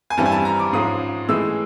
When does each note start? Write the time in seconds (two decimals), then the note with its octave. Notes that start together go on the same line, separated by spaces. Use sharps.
0.10 G#5
0.17 G2 E3 G3 C4 A5
0.26 G#5
0.32 A5
0.45 A#5
0.59 D6
0.73 G#2 F3 G#3 C#4 D#6
1.29 A2 E3 G#3 E6